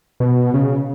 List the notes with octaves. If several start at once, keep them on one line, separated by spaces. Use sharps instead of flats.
B2
C#3